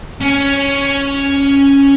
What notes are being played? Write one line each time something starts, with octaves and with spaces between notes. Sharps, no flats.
C#4